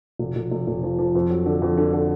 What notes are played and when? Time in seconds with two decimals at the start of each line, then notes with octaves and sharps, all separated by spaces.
0.19 F1
0.36 F1
0.51 F1
0.67 F1
0.83 F3
0.99 F3
1.15 F2
1.30 F#3
1.46 D3
1.62 F2
1.78 D3
1.93 D3